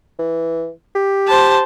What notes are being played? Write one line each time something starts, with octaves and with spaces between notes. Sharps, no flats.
E3
G4
C5 A5